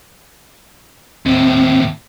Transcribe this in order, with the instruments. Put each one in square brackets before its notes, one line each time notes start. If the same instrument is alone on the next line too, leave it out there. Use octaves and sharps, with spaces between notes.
[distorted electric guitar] D#2 A2 [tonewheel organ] C4